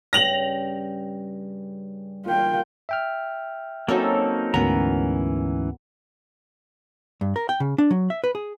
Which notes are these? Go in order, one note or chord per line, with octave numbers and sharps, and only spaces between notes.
G2 C#3 G5 A#6 F7 F#7
A#2 F4 F5 G5
E5 G5 F6
F#3 A#3 C4 C#4 D#4 A4
D2 G#2 E3 B3 C#4 A#4 A#5
G2
A#4
G5
C#3
D4
F#3
E5
B4
G#4